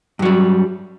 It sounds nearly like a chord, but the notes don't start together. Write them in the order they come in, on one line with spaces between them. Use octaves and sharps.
G2 F#3 G3